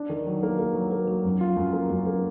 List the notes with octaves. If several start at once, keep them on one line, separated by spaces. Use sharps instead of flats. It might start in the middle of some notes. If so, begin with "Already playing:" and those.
Already playing: D4
D#3
F#3
A#3
A#3
F#3
A#3
F#3
F#2
F4
F#2
A#3
F#2
A#3